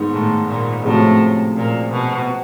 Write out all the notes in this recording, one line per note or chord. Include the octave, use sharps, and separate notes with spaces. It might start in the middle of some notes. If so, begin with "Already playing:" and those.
Already playing: G#2 D#3 G#3 B3 D#4
A2
A#2
A2 C3 F3 G#3 C#4 F#4
A#2
B2